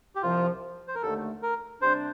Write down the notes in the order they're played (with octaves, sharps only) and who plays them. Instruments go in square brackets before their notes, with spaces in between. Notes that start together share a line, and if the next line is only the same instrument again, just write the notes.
[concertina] G4
[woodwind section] C2 C3 F3 [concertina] F4
[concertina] C5
A#4
[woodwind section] D#2 D3 A3 [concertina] A4
[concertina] A#4
[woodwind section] C3 G3 D4 [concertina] C5